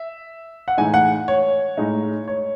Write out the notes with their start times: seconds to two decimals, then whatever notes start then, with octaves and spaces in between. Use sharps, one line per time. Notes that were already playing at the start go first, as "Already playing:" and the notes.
Already playing: E5
0.68 F#5
0.78 A2 E3 G#3 D#4 G#5
0.94 F#5
1.28 C#5
1.77 A2 G#3 D#4
2.28 C#5